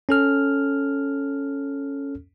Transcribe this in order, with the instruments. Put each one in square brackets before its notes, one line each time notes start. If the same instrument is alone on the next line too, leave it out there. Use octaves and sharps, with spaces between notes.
[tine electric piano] C#4 A4 F6